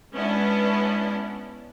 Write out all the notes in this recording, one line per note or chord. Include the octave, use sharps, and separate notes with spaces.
G#3 B3 C#4 D4 E4